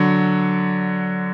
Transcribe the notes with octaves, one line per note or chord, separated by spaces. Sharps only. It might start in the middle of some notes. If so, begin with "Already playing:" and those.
Already playing: D3 F#3